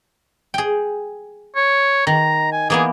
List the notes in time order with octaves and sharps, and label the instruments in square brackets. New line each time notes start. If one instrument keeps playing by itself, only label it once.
[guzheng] G#4 G5
[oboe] C#5
[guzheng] D#3 [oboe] A#5
[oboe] G#5
[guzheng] E3 A#3 B3 [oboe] G#4